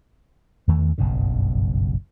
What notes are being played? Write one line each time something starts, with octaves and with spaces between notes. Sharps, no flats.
E2 D#3 E3 A3
F#1 B1 G2 C#3